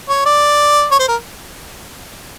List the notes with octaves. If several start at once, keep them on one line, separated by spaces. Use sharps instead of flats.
C#5
D5
C#5
C5
A#4